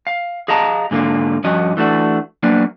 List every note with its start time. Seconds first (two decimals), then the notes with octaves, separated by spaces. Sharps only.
0.07 F5
0.48 G#4 D#5 F5 A5 A#5
0.91 G#2 D3 A#3 F4
1.44 G2 F3 C#4 F#4 D#5
1.77 E3 A3 D4 F#4
2.43 F#3 A#3 B3 D4